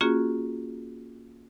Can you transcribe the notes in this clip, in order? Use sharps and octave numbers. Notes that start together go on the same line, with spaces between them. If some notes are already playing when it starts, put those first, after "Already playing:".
A#3 C#4 F4 F#4 G#4